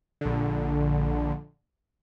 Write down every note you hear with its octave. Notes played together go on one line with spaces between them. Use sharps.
A#1 D3